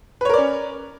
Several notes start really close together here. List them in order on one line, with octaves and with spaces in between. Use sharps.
B4 C#5 A#4 D5 C#4